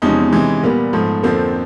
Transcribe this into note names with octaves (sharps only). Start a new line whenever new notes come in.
E2 C3 F3 G#3 C#4 D#4
C3 E3 G#3
A#2 G3 A#3 B3
G#2 F3 A3
F2 D3 F3 A3 A#3 C4